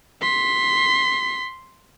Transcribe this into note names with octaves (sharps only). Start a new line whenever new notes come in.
C6 B6